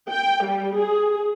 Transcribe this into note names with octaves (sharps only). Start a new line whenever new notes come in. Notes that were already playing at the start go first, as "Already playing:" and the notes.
G5
G3
G#4